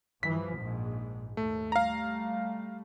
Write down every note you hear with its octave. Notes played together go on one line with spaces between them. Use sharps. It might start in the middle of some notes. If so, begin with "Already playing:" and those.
G2 E3 F3 B6
A#1 G#2
D#2 A3
G3 A3 F5 A#5